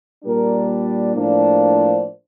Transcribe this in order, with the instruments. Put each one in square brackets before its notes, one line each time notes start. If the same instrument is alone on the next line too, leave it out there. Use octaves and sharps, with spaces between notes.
[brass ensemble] A#2 G3 D4 A#4
A2 F3 A#3 D4
C5